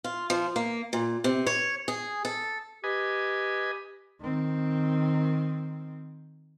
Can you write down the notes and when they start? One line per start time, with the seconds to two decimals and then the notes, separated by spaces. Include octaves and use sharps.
0.04 F4
0.30 F3
0.56 A#3
0.93 A#2
1.24 C3
1.47 C#5
1.88 G#4
2.25 A4
2.84 G4 B4 D#5 G#5
4.21 D#3 C4